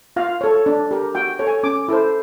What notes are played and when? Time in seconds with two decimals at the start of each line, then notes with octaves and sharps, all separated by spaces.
0.16 F4 F5
0.41 A4 C#5
0.66 D4
0.91 G4 A#4
1.15 F#4 G5
1.39 A4 C#5
1.47 G#5
1.63 C#4 D6
1.88 E4 A4 C5